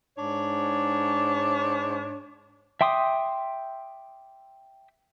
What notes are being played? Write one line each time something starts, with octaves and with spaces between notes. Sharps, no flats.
G#2 D4 C#5
E5 G5 C6 D6 D#6